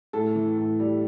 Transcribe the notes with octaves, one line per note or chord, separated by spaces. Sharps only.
A2 A4
E3
A2
G3